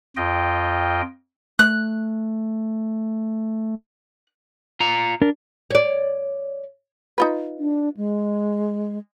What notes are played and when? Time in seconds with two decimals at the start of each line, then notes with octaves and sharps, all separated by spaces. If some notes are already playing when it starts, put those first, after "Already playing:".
0.17 F2 F4 D#5 G5
1.59 A3 F#6
4.80 F4 A#5
5.22 D4 A#4
5.71 C#5 D5
7.18 D#4 F4 B4
7.59 D4
7.97 G#3